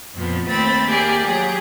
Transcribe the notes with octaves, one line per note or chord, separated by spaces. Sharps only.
F2 A#2 F3 B3
D#2 A3 C4 B5 A6
A#3 G4 G#4 D5
F#3 G4 G#4